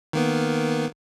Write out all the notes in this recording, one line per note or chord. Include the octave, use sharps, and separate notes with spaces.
D#3 A#3 B3